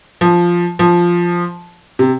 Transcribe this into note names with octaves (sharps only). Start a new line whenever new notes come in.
F3
F3
C3